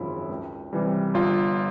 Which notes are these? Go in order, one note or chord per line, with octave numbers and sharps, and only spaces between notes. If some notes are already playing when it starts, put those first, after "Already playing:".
Already playing: G#1 F#2 C#3 F3 E4
C#2
C3 E3 G3
G1 F4